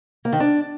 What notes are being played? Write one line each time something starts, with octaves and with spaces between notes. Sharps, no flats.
A#3
D#3
D4